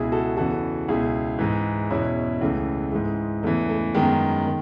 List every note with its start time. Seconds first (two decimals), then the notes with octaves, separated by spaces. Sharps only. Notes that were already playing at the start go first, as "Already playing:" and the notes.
Already playing: C#2 B2 E4 G#4
0.12 F#4 A4
0.37 E2 C#3 E3 F#4 A4
0.88 C#2 B2 E4 G#4
1.39 G#2 E3
1.90 E2 B2 C#4 E4
2.41 C#2 C#3 E3 A3
2.92 G#2 E3 G#3
3.43 E2 C#3 E3 A3
3.69 A3
3.94 F#2 D#3 G#3 B3
4.46 D#3